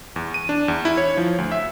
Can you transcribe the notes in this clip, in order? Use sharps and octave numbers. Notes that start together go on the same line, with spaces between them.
E2
D#7
D4
E2
E4
C#5
F3
D2
E5